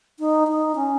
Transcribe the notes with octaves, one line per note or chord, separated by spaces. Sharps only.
D#4
D#4
C#4